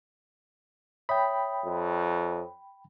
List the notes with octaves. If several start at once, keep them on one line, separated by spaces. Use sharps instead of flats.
C#5 E5 G5 B5 D#6
F2